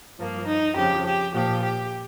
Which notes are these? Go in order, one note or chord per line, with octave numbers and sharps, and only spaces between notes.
G2 F3 A#3
D#4
F2 C#3 F3 G4
G4
A#2 F3 G4
G4